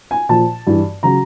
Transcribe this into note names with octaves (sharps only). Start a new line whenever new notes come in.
G#5
A#2 F3 A5
G2 E3
C#3 F#3 A#5